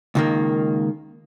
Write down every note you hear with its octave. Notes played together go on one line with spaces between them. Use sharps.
C#2 D#3 A#3